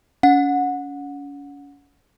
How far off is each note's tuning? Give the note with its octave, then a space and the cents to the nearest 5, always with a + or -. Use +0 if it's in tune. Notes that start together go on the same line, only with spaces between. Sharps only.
C#4 +35 F#5 -20